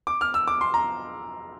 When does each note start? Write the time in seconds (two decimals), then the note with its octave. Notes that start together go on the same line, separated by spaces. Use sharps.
0.07 D6
0.21 F6
0.34 E6
0.48 D6
0.61 C6
0.74 A#5